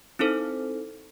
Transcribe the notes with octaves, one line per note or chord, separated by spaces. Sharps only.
C4 D#4 E4 A4 C5